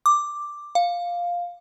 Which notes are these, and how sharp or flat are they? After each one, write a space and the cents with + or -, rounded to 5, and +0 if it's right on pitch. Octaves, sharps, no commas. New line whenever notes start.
D6 +5
F5 +5